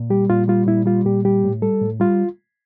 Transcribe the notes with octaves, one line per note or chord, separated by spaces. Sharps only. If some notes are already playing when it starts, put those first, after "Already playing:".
Already playing: A#2
G3 G4
A#2 F4
G3 F4
A#2 E4
G3 F4
A#2 G4
G3 G4
A2
G3 A4
A2
G3 F4